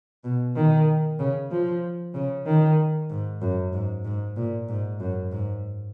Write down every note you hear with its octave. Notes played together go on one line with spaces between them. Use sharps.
B2
D#3
C#3
F3
C#3
D#3
G#2
F#2
G#2
G#2
A#2
G#2
F#2
G#2